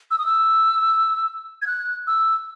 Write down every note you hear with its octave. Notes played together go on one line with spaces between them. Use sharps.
E6
D#6
E6
G#6
F#6
E6